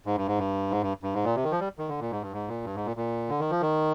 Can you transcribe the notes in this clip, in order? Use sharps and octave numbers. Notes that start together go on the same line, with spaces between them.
G#2
G2
G#2
G2
G#2
G2
G2
G#2
A#2
C3
D#3
F3
G3
D#3
D3
A#2
G#2
G2
G#2
A#2
G2
G#2
A#2
A#2
D3
D#3
F3
D#3